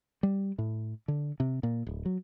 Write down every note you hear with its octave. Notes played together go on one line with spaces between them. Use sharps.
G3
A2
D3
C3
A#2
D1
F#3